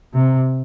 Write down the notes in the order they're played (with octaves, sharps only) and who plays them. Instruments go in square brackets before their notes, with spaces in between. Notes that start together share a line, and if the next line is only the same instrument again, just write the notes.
[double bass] C3